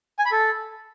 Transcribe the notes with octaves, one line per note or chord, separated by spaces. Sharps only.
G#5
B5
A4